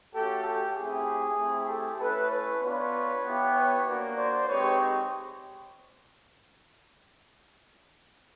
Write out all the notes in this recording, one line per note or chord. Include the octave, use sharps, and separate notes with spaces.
A3 C#4 F#4 G4 A4
G4
A3 C4 E4 G4 G#4
A3 C4 E4
G4 A4
A3 C#4 E4 A4 B4
B4 C#5
B3 D4 F4 B4 C#5
B3 E4 G4
B4 C#5
A#3 D4 F#4
C5 D5
G#3 C4 D#4 G4 B4 C#5